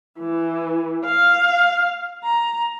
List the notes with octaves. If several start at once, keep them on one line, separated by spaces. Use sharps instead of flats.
E3
F5
A#5